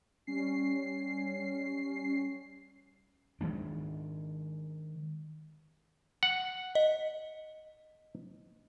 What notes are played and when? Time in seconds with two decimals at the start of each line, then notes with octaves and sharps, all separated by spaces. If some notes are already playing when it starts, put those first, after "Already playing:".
0.27 G3 C#4 C7
3.41 D#3 F3 G#3 D4
6.23 F#5
6.75 D#5